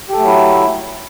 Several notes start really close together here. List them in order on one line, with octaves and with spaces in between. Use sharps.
G4 A4 A3 F#3 E4